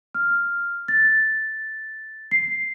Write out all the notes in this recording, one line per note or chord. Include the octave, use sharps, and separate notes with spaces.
F6
A6
C7